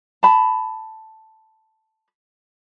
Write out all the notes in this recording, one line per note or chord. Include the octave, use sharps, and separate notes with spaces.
A5 B5